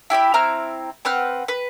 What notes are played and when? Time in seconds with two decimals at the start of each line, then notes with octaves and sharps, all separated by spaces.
0.10 E4 G4 E5 B5
0.34 C4 E4 A#5 F6
1.05 C4 B4 F#5 F6
1.48 B4